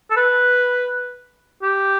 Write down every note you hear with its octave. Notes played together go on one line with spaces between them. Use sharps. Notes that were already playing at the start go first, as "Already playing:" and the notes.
A4
B4
G4